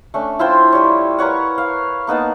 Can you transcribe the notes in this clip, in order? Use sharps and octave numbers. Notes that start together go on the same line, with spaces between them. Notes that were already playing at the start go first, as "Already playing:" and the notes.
A3 C#4 D4
E4 F4 C5 G5
G3 C#5
A#4 B4 C#5 F#5
F5
A#3 B3 D#4 A5